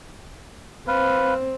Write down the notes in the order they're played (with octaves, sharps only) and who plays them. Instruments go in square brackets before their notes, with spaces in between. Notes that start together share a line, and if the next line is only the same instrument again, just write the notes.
[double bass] C4 [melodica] B4 F5